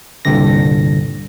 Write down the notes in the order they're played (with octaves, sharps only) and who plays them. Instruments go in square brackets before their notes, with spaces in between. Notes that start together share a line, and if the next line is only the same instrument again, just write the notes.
[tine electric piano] C2 G2 A#2 D3 A#6